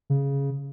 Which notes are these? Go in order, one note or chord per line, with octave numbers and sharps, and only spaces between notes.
C#3